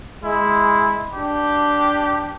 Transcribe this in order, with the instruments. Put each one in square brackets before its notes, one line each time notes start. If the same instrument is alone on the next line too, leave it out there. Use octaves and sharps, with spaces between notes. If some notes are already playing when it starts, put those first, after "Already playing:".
[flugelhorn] G#3 [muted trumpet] E4
[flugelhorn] D4 [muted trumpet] G4